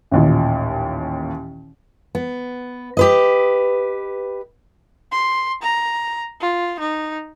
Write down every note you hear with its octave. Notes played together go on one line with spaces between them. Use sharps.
A1 D#2 A#2
B3
G4 B4 D#5
C6
A#5
F4
D#4